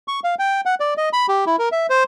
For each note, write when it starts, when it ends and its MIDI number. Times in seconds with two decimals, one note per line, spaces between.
0.08 0.20 85
0.24 0.35 77
0.39 0.61 79
0.65 0.75 78
0.80 0.94 74
0.97 1.09 75
1.13 1.26 83
1.28 1.45 67
1.47 1.56 64
1.59 1.69 70
1.72 1.86 76
1.90 2.03 72